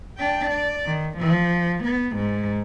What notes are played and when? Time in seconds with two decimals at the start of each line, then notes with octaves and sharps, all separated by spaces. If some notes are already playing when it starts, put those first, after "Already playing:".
0.17 D4 G5
0.50 D5
0.85 D#3
1.17 F3
1.83 B3
2.16 G#2